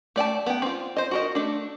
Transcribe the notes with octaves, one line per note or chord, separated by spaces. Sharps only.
A3 D5 G5 A5
B3 G5
C4 F4
C5 D#5
F#4 A#4 D#5
A3 D4